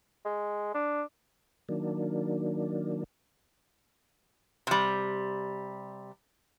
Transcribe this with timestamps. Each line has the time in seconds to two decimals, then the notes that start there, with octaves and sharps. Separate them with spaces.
0.25 G#3
0.74 D4
1.69 D#3 F#3 A#3 D4
4.67 C3 G3